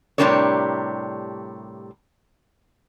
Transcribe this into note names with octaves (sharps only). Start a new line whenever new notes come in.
A2 C3 G3 D4 A#4 C#5